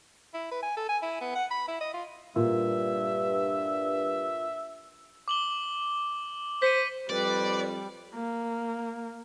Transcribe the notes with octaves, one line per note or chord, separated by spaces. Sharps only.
E4
B4
G#5
A4
G#5
E4
B3
F#5
B5
E4
D#5
F4
G2 A#2 E5
D6 F#7 G7
C5 B6 C#7 D#7
F2 G3 B4 D5
A#3